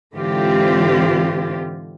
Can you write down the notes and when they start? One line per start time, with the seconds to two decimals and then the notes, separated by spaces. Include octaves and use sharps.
0.14 G#2 D3 E3 C4 F4 G4